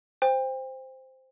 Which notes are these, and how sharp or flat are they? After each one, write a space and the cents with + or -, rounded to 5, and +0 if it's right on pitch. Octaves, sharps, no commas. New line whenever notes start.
C5 -5 G5 +35